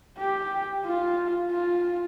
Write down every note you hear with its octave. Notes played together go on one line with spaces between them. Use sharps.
G4
F4
F4